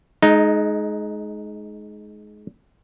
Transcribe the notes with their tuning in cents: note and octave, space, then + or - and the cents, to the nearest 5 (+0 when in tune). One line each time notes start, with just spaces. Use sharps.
G#3 +25 D#4 +0